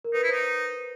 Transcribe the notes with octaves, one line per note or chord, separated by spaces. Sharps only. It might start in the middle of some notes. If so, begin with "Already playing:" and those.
A#4
D#4 B4
E4
D#4 C5